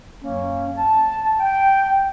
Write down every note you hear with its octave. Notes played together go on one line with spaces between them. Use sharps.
F#2 F#3 A#3 C#4
A5
G5